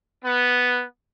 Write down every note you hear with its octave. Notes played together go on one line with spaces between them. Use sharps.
B3